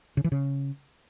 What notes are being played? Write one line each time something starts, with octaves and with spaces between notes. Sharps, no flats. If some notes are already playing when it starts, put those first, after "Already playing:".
C#3
E3
C#3